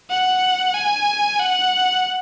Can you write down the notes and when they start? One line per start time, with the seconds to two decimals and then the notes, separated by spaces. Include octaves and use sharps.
0.10 F#5
0.75 G#5
1.40 F#5